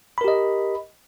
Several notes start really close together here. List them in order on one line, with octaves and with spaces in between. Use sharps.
B5 A#4 G4 D#5